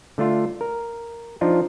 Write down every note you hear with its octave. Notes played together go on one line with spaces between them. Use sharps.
D3 A3 D4 F4
A#4
F3 D4 D#4 F4